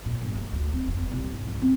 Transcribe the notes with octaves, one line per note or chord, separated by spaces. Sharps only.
A#2
G1
A3
D2
C4
F1
E2
C2
G#2
C#2
C4